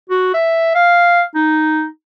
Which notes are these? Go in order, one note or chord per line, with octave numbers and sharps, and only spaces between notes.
F#4
E5
F5
D#4